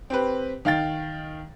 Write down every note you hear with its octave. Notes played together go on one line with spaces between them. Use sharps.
C4 G4 B4
D#3 F5 G5 A6